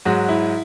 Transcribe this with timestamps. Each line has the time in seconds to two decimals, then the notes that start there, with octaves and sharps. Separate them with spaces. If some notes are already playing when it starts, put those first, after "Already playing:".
0.05 G#2 F#3 F#4
0.29 E4